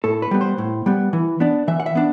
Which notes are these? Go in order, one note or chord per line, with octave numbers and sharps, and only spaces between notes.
A2 A4
B4
G3 B3
C5
A2
G3 B3
E3
B3 D4
E3 E5
F#5
E5
B3 D4